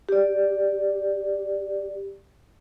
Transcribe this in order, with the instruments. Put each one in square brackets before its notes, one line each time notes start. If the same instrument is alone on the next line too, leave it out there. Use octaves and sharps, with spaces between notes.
[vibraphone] G4 D5